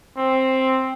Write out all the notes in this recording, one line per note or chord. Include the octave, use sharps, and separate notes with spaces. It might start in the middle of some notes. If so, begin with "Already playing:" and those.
C4